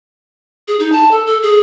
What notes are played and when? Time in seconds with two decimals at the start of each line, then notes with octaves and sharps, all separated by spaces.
0.68 G#4
0.80 D#4
0.92 A5
1.11 A4
1.26 A4
1.42 G#4